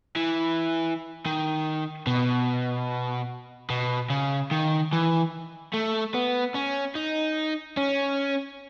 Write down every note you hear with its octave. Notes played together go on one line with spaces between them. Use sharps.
E3
D#3
B2
B2
C#3
D#3
E3
A3
B3
C#4
D#4
C#4